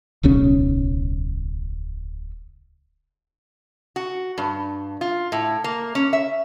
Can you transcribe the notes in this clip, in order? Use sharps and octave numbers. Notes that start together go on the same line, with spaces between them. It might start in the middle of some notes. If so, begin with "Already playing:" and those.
D1 B1 C#3 C#4
F#4
G2
F4
A2
A#3
C#4
E5